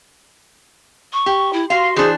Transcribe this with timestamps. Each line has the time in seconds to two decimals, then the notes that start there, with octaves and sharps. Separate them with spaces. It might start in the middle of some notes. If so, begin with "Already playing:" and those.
1.13 C#6
1.26 G4
1.53 E4
1.70 F#4 F5 C6
1.96 E3 D4 G#4 C5